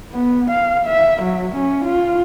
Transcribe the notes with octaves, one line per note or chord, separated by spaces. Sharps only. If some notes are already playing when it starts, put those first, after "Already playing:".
B3
F5
E5
F#3
C#4
F4